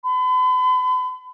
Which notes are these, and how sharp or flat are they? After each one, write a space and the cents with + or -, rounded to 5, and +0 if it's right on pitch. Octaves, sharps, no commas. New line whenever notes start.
B5 +40